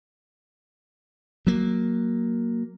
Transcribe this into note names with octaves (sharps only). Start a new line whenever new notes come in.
F#3 A#3